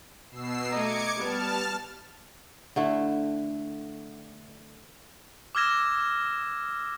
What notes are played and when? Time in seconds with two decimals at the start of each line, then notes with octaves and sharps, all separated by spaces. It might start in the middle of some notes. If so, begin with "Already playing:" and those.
0.31 B2 E6 C7
0.70 A3 D#5 A#5 D6 G#6 C#7
1.18 G3 B3 A5 F6
2.76 D3 A3 E4
5.55 D6 E6 F6 G#6 A#6 E7